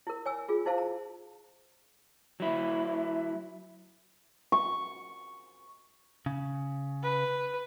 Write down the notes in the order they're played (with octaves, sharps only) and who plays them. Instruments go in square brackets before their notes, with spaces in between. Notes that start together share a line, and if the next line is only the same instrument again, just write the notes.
[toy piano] E4 A#4
C#5 G#5 E6
F4 G#4
D#4 E4 C5 F5 A5
A#5
[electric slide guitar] F#3 E4
[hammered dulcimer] C#6
[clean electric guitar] C#3
[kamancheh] B4